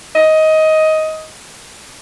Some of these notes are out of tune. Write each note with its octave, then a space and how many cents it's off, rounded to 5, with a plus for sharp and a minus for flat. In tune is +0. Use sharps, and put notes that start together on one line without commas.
D#5 +15